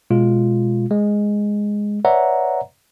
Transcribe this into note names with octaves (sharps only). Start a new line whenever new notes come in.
B2 G#3 F4
G#3
B4 C#5 D5 E5 F#5 A#5